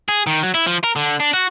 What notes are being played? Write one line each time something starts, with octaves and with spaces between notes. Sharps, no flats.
G#4
D#3
F#3
E4
F3
A#4
D3
D4
F#4